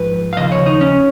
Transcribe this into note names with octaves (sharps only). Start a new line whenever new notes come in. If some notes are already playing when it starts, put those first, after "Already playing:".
Already playing: G#2 F3 B4
F5
D#2 C#3 F3 D#5
C#5
D#4
C#4